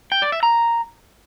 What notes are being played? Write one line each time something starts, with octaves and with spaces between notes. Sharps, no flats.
G5
D5
E5
A#5